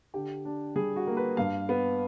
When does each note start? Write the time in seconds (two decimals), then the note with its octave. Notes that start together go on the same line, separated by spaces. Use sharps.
0.14 D3 G4
0.45 D4
0.76 G3 G#4
0.96 F#4
1.07 A#3
1.17 B4
1.37 G2 F5
1.69 B3